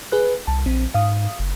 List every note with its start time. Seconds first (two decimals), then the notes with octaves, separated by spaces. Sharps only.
0.12 G#4 B4 F#6
0.47 C2 A5
0.66 A#1 C4
0.94 G#2 F5 D#6
1.39 F#1